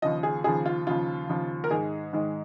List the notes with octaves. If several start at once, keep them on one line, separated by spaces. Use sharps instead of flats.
D#2 C#3 F3 D#5
G#4
D#2 C#3 F3 G#4
F4
D#2 C#3 F3 F4
D#2 C#3 F3
A#4
G#2 D#3 G#3 G#4
G#2 D#3 G#3